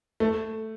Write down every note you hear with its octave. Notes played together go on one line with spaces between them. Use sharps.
A3